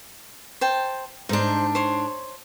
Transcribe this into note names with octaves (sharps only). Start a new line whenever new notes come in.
C5 G5 A5
G#2 D4 D#4 C5
C5 C#5 C6